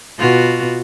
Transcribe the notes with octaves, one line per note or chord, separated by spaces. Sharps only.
B2 F4 F#4